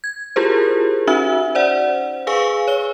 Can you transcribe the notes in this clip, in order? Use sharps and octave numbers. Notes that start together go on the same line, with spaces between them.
G#6
E4 F4 G4 G#4 A#4 C5
C#4 D#4 F#4 E5 E6
C5 D5 F#5
G#4 B4 F5 G#5 C#6 E6
C#5 G7